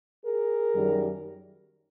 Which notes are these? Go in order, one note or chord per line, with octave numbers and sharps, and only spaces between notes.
G#4 A#4
F#2 D#3 G3